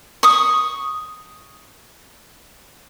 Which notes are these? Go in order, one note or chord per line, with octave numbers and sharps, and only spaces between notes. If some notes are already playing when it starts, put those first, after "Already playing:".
C#6 D#6